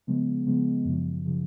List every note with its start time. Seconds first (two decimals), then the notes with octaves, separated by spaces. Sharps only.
0.07 C#3 F3 G#3 B3
0.46 C#3 F3 G#3 B3
0.85 F#2 C#3 F3
1.25 C#3 F3